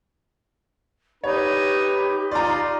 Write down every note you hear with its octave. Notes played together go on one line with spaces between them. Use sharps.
D#4 G4 B4 C#5
D#4 F4 D5 A#5 C6